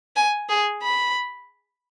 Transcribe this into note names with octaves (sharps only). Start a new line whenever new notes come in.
G#5
G#4
B5